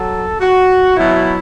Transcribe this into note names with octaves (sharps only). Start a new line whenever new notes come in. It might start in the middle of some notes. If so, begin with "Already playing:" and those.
Already playing: F#3 A4
F#4
B2 F#3 E4